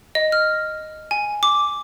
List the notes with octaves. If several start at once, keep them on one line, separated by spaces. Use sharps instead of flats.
D#5
F6
G#5
D6